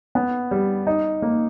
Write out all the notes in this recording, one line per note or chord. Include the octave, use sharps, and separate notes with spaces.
B3
G3
D#4
A#3